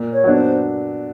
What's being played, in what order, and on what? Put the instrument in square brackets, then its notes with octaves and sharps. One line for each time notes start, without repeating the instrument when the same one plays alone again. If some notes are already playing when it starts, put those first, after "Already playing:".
Already playing: [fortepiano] A#2
[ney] C#5
[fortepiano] F#3 B3 D4
[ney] C5